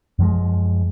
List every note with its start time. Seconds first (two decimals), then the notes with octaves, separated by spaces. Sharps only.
0.19 F#2 F3 G#3